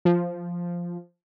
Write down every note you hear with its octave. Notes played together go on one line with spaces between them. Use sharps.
F3